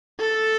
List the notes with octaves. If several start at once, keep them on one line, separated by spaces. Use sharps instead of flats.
A4